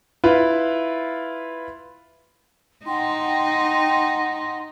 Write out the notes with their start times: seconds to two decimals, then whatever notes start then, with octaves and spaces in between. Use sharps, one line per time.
0.24 E4 F4 B4
2.86 D#4 F#5 G5 C6